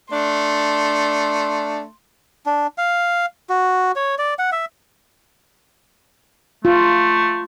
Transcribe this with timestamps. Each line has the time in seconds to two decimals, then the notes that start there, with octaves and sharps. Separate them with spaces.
0.12 A3 D4 C6
2.46 D4
2.78 F5
3.50 F#4
3.96 C#5
4.18 D5
4.39 F#5
4.52 E5
6.65 A3 F4